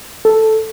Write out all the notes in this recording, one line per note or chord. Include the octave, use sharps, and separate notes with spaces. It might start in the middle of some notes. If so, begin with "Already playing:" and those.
A4